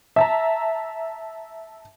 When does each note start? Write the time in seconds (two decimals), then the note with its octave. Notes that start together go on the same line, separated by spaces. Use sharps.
0.16 E5 A5 A#5